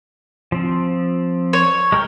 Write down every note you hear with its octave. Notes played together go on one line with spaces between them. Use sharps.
F3 C4
C#5
G#3 A#4 G5